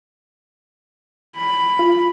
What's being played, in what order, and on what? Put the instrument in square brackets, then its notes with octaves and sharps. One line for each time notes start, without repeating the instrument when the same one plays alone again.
[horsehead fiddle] B5
[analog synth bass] F4